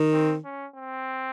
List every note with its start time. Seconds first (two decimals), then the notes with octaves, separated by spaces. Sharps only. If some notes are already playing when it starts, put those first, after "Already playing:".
Already playing: D#3
0.13 C4
0.44 C#4
0.76 C4